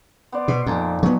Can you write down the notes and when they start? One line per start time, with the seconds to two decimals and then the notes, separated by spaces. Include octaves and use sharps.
0.32 B3 C5 D5
0.48 B2
0.66 F2 A#2 F3 D#4
1.03 F#3 B3 F#4